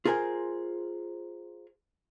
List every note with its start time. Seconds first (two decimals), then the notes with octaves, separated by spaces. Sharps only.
0.05 F4 G#4 A#4 C5 G#5